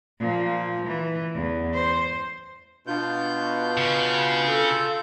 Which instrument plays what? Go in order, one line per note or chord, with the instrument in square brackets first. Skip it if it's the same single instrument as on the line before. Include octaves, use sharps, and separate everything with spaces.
[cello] A#2 F3
E3
E2
C5
[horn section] B2 [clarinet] D4 [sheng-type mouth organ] F4 G6
[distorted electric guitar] C#3
[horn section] A4